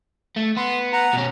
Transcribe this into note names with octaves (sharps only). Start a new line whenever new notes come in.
A3
B3 C6
F#5 A#5
B2 C#4